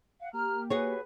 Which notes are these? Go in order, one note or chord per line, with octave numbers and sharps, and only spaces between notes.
F5 F#5
A#3 G4 A#5 F6
F#4 G#4 B4 C#5 G#5